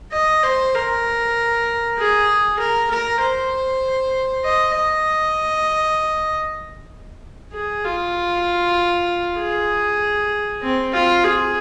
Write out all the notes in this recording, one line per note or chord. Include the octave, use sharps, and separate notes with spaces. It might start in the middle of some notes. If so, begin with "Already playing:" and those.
D#5
C5
A#4
G#4
A#4
A#4
C5
D#5
D#5
G#4
F4
G#4
C4
F4
G#4